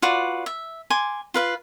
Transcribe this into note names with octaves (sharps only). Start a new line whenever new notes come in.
F4 F#4 B4 D5
E5
G#5 C6 D6
F4 B4 F5